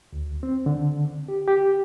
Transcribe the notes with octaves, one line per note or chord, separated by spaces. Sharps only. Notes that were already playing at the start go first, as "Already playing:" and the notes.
D2
C4
D3
G4
G4